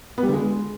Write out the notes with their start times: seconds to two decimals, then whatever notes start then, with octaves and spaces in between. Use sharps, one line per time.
0.18 B3
0.23 G3
0.28 D3
0.33 G#3